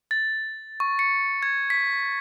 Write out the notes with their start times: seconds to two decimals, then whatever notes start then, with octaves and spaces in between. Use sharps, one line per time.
0.11 A6
0.80 C#6
0.99 C#7
1.43 G#6
1.70 B6